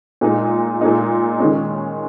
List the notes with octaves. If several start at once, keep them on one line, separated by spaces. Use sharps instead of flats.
A#2 G#3 D#4
A#2 G#3 D#4
D#3 G#3 C#4